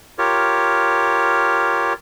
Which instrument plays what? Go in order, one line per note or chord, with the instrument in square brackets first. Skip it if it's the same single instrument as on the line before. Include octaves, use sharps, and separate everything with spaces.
[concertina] F4 G4 A#4 C#5